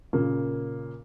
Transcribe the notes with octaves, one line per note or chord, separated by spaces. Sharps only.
A#2 C#3 A#3